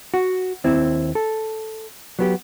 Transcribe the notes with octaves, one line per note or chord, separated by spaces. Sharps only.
F#4
D#2 C4 E4
A4
F#3 B3 G4